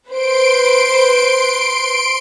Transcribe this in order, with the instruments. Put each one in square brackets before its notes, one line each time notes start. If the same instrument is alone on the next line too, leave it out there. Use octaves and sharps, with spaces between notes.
[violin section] B4 C5 [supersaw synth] C6 D7